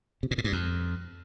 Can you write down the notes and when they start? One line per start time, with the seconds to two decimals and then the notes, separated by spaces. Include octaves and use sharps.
0.23 C3
0.31 A#2
0.38 A2
0.44 G2
0.53 F2